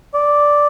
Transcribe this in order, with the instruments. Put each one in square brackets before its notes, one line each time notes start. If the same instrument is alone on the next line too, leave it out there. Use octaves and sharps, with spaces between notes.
[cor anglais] D5